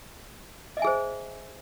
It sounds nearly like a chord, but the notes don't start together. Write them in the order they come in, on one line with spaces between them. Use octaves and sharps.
D#5 E5 G#5 G#4 C5